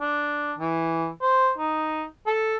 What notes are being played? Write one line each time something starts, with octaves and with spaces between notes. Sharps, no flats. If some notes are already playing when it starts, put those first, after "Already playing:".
D4
E3
C5
D#4
A4